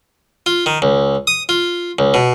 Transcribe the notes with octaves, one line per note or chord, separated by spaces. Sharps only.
F4
D#3
C#2
D#6
F4
C#2
B2